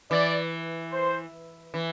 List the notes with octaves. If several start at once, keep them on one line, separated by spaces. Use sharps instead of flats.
E3 D5
C5
E3